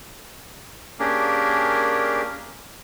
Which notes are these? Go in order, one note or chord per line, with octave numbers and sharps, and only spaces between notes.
A#3 C#4 D4 G4 G#4 A#4